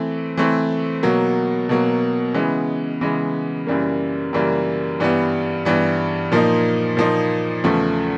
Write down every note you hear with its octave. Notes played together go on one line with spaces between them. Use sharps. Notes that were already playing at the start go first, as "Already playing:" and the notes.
Already playing: E3 A3 C4
E3 A3 C4
B2 F#3 A#3
B2 F#3 A#3
C#3 E3 G#3 B3
C#3 E3 G#3 B3
F#2 C#3 E3 G3 A#3
F#2 C#3 E3 G3 A#3
G2 E3 G3 B3
G2 E3 G3 B3
A#2 F3 A#3 D#4
A#2 F3 A#3 D#4
E2 C#3 F3 A3